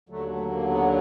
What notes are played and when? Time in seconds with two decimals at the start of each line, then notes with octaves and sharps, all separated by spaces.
0.09 D#2 D3 F#3 A3
0.29 A3
0.50 A#3
0.70 B3